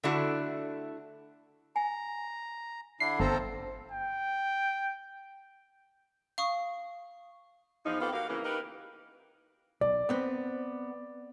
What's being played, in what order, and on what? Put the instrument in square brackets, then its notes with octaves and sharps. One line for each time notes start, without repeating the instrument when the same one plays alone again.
[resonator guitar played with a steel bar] D3 A3 D4 E4 F#4
[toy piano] G#5 [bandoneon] A#5
[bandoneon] D3 D4 E4 [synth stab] C7
[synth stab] G1 [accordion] C4 A4 [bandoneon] F4 C5 A#5
[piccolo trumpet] G5
[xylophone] F5 C#6 D#6
[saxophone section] E2 F3 D#4
B3 C4 F4 G4 A4 B4
A#3 F#4 G4 F5
C#3 E3 A#3
D#4 G4 A#4 B4
[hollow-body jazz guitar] B1 [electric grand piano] D5
[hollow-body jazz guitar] B3 C4 B4